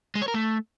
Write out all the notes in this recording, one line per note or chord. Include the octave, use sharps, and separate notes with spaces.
G#3
C#5
A#4
A3